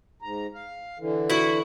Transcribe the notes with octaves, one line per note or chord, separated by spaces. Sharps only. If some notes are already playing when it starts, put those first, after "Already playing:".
G#2 A#5
F5
D3 E3
E4 F#4